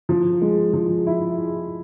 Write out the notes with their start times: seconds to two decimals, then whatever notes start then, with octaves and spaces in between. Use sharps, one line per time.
0.09 F3
0.41 G#3
0.73 F3
1.07 E4